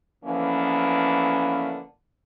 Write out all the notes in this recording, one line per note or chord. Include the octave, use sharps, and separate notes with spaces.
D3 E3 F3 A#3 B3 C#4